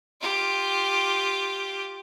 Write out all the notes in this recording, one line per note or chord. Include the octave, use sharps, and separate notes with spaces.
F4 G4